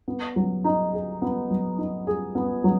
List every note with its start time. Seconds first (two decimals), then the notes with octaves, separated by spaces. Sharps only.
0.08 B3
0.36 F#3
0.64 D#4
0.93 G#4
1.22 B3
1.50 F#3
1.78 D#4
2.07 G#4
2.35 B3
2.64 F#3